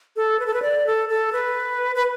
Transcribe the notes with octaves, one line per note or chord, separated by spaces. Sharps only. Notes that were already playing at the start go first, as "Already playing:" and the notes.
A4
B4
A4
B4
D5
A4
A4
B4
B4